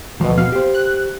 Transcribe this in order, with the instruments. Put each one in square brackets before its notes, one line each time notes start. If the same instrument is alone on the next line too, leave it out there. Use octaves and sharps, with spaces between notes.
[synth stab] D2 B2 [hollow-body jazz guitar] F3
[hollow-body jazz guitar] B2 B3 F#4 [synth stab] F5
[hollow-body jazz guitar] G4 C5
[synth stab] F#6